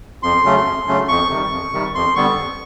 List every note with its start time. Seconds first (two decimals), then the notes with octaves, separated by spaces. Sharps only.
0.23 F2 C6
0.44 C#3 F#3 A3 C#4
0.66 F2
0.87 C#3 F#3 A3 C#4
1.08 F2 C#6
1.30 C3 D#3 G3
1.52 F2
1.73 C3 D#3 G3
1.95 F2 C6
2.15 D3 G3 B3 C#6
2.37 F2